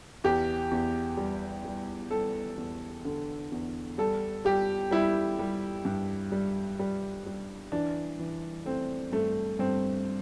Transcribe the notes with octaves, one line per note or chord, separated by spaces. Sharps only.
E2 G4
E2
G3
G3
G3 A4
E2
D3
E2
G3 A4
G3 G4
G3 E4
G3
G2
G3
G3
G3
E3 D4
E3
A3 C4
G2 A3
G2 C4